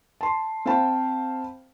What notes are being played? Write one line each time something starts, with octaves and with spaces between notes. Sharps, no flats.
A5 C6
C4 C5 F5 G5 A5 B5